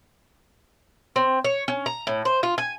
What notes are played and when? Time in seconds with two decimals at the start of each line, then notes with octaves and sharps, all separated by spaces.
1.16 C4
1.44 C#5
1.68 C#4
1.86 A#5
2.07 A2
2.25 C5
2.43 F4
2.58 G#5